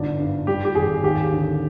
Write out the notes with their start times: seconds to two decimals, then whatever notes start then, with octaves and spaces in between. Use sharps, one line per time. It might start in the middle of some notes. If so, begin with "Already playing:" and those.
Already playing: G1 G#2 D4
0.20 G2
0.47 G3 G4
0.65 G4
0.75 G#1 G#4
1.04 D#2 G4
1.32 D3